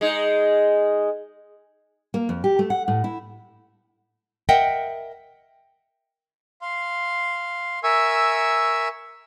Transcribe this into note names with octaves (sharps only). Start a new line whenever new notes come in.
G#3 D#4
A#3
F2
G4
A3
F#5
A2
E4
A#4 D#5 E5 F#5 G5
F5 C6
A#4 E5 G#5 C#6 E6